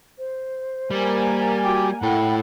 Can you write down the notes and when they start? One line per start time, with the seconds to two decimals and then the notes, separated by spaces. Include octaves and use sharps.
0.17 C5
0.91 G3 A#3 A#4 G#5
1.63 F#4 G5 D6
2.02 A2 E4 A4 F#5 G5 B5